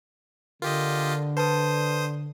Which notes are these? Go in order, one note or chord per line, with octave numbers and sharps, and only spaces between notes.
D3 F4 G4 A#4 D#5
B4 C5 A5 D#6